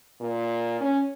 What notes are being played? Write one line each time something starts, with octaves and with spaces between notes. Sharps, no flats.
A#2
C#4